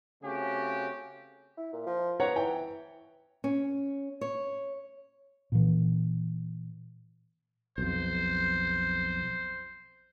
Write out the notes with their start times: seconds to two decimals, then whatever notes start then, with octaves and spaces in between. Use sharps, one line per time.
0.22 C#3 A3 C4 C#4 F#4 G4
1.58 E4
1.73 A#2
1.87 F3
2.20 B3 C#5 F#5 A#5
2.36 E3 G5
3.44 C#4
4.21 C#5
5.52 A#2 E3
7.78 B1 F2 C5